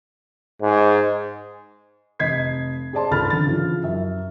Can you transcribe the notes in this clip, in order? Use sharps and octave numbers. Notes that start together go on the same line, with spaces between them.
G#2
F1 D#5 G#6 B6 C7
G#4 C5 D5 A5 C6
G#1 C#2 A4 B5 F6 A6
D3 A6
C#3 E3 F3
F#2 E5